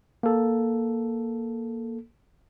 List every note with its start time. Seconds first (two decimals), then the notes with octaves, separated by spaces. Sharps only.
0.23 A#3 A4